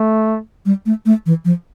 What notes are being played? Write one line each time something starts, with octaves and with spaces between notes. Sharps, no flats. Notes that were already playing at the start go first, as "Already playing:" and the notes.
Already playing: A3
G3
A3
A3
E3
F3